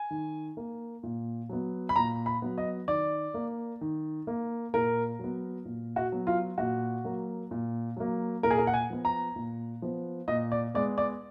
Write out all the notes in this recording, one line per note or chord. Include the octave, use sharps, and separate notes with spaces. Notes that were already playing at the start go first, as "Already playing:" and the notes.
Already playing: G#5
D#3
A#3
A#2
F#3 B3
B5
A#2 A#5
B5
F#3 B3
D#5
D#3 D5
A#3
D#3
A#3
A#2 A#4
F#3 B3
A#2
F#4
F#3 B3
F4
A#2 F#4
F#3 A#3
A#2
F#3 A#3
A#2 A#4
G#4
A#4
F#5
G#5
F3 B3
A#5
A#2
F3 B3
A#2 D#5
D5
G#3 B3 D5
D5